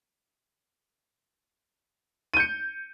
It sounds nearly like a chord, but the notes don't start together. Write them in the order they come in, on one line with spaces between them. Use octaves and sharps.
D#7 G6 C#7